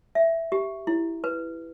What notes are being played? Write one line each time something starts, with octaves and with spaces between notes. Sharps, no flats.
E5
G4
E4
B4